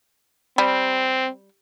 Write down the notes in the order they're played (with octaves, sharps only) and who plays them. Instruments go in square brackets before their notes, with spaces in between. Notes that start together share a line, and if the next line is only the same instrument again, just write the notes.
[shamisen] G3 [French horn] C4